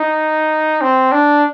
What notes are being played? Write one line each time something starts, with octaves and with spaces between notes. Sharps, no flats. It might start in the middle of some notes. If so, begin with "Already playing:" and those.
Already playing: D#4
C4
D4